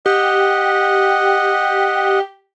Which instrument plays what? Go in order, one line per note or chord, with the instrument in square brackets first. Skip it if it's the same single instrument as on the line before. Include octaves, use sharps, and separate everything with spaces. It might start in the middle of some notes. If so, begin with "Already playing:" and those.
[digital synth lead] G4 [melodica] D#5 F#5